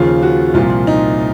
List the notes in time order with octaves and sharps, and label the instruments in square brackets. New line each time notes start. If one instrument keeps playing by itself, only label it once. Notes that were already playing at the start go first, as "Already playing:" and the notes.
Already playing: [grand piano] D#2 C#3 F3 F4
F#4
C2 A#2 F3 F4
D#4